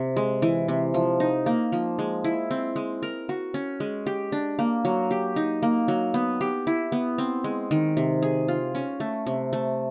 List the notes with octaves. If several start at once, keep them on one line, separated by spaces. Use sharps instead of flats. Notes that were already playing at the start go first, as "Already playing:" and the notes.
Already playing: C3
G#3
E3
C3
F3
D#4
A#3
F3
G#3
E4
C4
G#3
A#4
F#4
C#4
G#3
G4
D4
A#3
F#3
G4
D#4
A#3
F#3
B3
G4
E4
B3
C4
G#3
D#3
C3
G#4
F4
C#4
A3
C3
A3